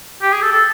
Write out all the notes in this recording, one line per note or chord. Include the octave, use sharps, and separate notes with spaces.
G4
G#4
A4
A4